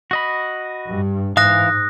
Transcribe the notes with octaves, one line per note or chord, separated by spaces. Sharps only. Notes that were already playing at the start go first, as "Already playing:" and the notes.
F#4 D#5 B5
G2
G#2 E3 E5 F5 D#6 F#6 A#6